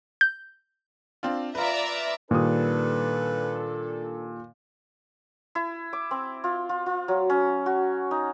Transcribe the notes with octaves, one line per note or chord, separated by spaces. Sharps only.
G6
C4 D4 F4
F4 B4 D5 E5 A#5
A#2 D#3 G3 D4 A4 B4 D#6
E4
D6
C4
F4
F4
F4
F#3
C#4
F#4
D#4